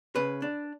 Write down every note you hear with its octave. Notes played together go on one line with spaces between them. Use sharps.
C#3 B4
D4